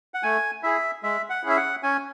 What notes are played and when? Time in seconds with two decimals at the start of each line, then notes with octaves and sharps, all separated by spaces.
0.14 F#5
0.23 A3 G#5
0.63 E4 G#4 E5
1.03 G#3 E5
1.30 F#5
1.43 C#4 E4 G#4
1.49 E5
1.57 F#5
1.83 C#4 G#5